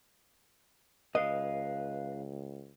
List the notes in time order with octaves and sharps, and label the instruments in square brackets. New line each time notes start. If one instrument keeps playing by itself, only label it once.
[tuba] C#2 [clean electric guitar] B4 F5 [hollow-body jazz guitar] D#5